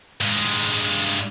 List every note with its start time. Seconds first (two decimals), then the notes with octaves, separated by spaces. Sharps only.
0.21 G2 G#3